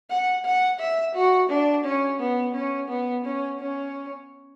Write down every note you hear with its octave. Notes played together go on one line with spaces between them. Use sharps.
F#5
F#5
E5
F#4
D4
C#4
B3
C#4
B3
C#4
C#4